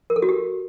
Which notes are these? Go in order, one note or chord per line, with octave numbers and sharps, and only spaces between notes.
A#4
A4
F#4
G4